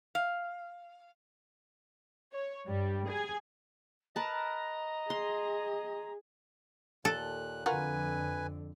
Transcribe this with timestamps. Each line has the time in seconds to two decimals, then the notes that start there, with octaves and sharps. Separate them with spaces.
0.15 F5
2.33 C#5
2.67 G2 G3
3.07 G#4 G#5
4.16 A#4 B4 D#5 A5 A#5
5.10 G#4 C6
7.05 D#2 A#2 A4 F#6
7.66 F2 D3 F4 F#4 A#4 B4 G#5